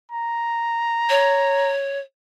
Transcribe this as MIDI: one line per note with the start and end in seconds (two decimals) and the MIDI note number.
0.12 1.73 82
1.09 1.99 73